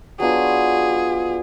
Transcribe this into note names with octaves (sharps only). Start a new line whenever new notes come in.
F#3 B3 D4 F4 G#4